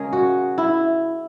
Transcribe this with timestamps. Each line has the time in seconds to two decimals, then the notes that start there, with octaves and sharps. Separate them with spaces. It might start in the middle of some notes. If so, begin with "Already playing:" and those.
Already playing: C#3 G#3 C#4 G#4 A#4
0.13 F#4
0.58 E4